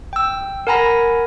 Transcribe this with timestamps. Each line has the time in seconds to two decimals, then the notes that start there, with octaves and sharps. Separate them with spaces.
0.13 G5 E6
0.67 A#4 F#5 G#5 A#5 B5 A#6